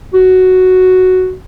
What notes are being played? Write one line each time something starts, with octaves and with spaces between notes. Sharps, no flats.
F#4